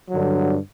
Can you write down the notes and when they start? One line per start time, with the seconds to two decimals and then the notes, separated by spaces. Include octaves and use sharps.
0.11 G2 D3 F#3